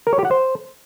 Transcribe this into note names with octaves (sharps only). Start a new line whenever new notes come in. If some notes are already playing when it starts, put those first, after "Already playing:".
A#4
C#5
G4
F#5
C5